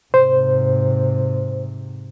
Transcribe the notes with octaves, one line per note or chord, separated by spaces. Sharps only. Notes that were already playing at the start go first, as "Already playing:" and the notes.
G#2 C3 C5